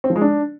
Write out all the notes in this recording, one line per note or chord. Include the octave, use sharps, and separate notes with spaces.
C4
F3
G#3
D4